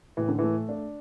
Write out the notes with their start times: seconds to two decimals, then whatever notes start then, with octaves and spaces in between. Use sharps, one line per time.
0.17 A2 E3
0.28 D3
0.39 E3 A3
0.69 D4